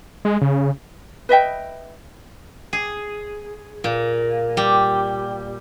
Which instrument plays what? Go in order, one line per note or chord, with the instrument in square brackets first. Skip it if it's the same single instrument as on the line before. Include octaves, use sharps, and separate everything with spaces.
[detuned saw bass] G#3
C#3
[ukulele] B4 D#5 E5 G5
[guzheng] G#4
A#2
G3